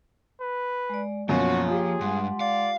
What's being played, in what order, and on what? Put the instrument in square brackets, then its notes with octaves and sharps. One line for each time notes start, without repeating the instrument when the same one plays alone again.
[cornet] B4
[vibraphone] G#3 D5
[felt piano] F#2 B2 [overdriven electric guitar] F3 [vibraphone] A#3 C#5 A#5 [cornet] F#4
[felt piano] F4 G4 [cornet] G#4
[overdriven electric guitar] G2 [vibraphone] G#3 F#5 C6
[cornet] D5 [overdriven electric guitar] F5